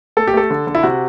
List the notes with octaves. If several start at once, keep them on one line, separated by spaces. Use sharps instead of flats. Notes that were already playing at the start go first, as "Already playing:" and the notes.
A3 A4
G4
A3 A4
D3
D3
E4
C3 F#4